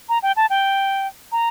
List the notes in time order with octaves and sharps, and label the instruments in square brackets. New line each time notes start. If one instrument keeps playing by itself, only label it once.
[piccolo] A#5
G5
A5
G5
A#5